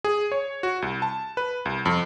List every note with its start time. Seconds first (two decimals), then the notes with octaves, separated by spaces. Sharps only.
0.04 G#4
0.32 C#5
0.63 F#4
0.82 C2
1.02 A5
1.37 B4
1.65 C2
1.86 F2